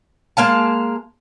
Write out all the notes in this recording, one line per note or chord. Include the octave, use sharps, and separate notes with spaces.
G#3 A#3 F5 A5